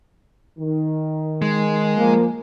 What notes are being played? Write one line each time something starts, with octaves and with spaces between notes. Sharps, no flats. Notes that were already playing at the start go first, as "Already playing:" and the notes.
D#3
G#3
F3 A#3